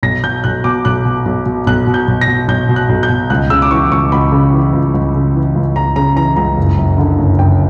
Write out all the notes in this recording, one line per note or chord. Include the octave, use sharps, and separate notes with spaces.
B1 A#6
B2 G6
B1 F#6
B2 D6
B1 F#6
B2
B1
B2
B1 F#6
B2
G6
B1
A#6
B2
B1 G6
B2
F#6
B1
G6
B2
C#2 F#6
C#3 E6
D6
E3 C#6
C#2 C#6
C#2 B5
C#3
E3
C#2
C#2
C#3
E3
C#2
C#2 A#5
C#3 A#5
E3 A#5
C#2 A#5
F#1
F#2
D3
F#1
F#1 G5